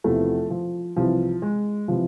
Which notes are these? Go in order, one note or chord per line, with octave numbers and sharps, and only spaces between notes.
E2 C3 E3 F3 A3
F3
C2 C3 E3 F3
G#3
C3 E3 F3